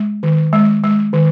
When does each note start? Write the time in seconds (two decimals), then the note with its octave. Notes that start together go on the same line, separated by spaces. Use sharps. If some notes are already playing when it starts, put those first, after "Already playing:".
Already playing: G#3
0.23 D#3
0.53 G#3
0.84 G#3
1.13 D#3